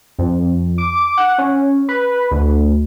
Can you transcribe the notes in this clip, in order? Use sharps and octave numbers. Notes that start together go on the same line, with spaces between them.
F2
D6
F#5
C#4
B4
D2